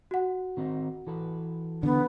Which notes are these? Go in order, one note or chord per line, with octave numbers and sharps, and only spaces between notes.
F#4 F#5
D#3 C4 D#4
E3 A4 B4
D3 B3